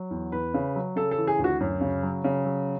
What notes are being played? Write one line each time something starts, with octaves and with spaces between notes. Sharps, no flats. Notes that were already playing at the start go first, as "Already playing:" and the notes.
Already playing: F#3
E2
E2 B4
C#3
F#3
C#3 A4
A4
E3
G#4
D2
F#4
F#2
C#3
F#3
C#3
F#3